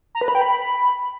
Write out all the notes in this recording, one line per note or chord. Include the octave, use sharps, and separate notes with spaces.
A#5
B4
B5
G5
B5